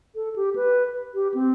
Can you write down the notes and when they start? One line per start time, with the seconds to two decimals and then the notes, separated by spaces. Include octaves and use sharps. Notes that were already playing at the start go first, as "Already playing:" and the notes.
0.15 A4
0.36 G4
0.56 B4
1.14 G4
1.34 C4